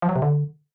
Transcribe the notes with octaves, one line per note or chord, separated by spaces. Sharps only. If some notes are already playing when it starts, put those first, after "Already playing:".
F3
F#3
C3
D3